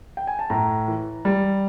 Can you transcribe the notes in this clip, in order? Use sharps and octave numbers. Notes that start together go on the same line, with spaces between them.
G5
G#5
A5
A2 A#5
E3
G3